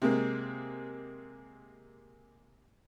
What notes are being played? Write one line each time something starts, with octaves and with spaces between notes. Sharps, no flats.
C3 G#3 A#3